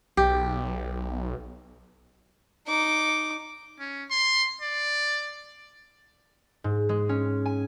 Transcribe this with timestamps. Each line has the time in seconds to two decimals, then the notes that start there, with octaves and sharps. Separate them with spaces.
0.17 B1 G4
2.68 D#4 D6
3.79 C#4
4.10 C6
4.61 D5
6.64 G#2
6.89 G#3
7.09 C#4
7.46 G#5